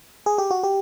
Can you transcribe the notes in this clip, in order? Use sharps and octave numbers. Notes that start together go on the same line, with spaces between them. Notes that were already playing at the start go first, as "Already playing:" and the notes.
G#4
G4
F#4
G4